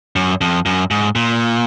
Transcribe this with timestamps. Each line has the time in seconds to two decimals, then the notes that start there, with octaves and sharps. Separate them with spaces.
0.16 F#2
0.41 F2
0.66 F#2
0.91 G#2
1.15 A#2